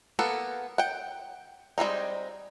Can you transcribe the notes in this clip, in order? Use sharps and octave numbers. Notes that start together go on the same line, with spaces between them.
A#3 B3 A4
F#5 G5
G3 G#3 C4 D#4